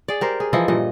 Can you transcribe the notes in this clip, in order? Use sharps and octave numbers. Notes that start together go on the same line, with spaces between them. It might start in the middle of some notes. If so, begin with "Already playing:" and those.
G#4 D5
G4 A#4 C5
G#4
E3 F3 E4 D#5
G2 A#2 D#5